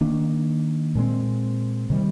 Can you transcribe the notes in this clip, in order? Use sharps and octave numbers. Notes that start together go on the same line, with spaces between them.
D#3 A#3 D4
A#2 G#3 C4
C3 D#3 G3